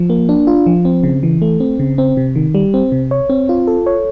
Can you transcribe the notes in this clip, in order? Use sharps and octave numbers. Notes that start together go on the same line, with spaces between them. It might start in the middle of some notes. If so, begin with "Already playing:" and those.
Already playing: F3
A#3
D4
F4
F3
C4
C#3
E3
A3
C4
C#3
C4
C3
D#3
G3
C4
C3
C#5
C4
F4
A4
C#5